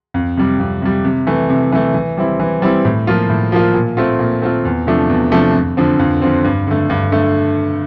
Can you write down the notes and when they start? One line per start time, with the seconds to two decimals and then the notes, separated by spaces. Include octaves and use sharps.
0.14 F2
0.37 C3 G3
0.60 F2
0.82 C3 G3
1.05 C3
1.27 E3 A3
1.50 C3
1.72 E3 A3
1.94 E3
2.17 G3 C4 E4
2.40 E3
2.62 G3 C4 E4
2.85 A2
3.07 F3 A#3 F4
3.30 A2
3.52 F3 A#3 F4
3.74 A#2
3.97 A3 C4 F4
4.19 A#2
4.42 A3 C4 F4
4.65 E2
4.87 C3 F3 A3 D4
5.09 E2
5.32 C3 F3 A3 D4
5.54 F2
5.77 D3 F3 C4
5.99 F2
6.22 D3 F3 C4
6.44 G2
6.67 D3 A3
6.90 G2
7.12 D3 A3